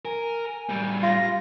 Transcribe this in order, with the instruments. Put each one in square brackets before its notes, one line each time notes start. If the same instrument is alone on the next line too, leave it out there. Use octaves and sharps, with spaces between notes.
[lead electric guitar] A#4 [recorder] G#5
[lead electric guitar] A2 G3
[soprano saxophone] F4 [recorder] A#6